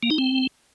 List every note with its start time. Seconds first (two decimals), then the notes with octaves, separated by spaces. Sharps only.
0.03 A#3
0.10 D#4
0.18 C4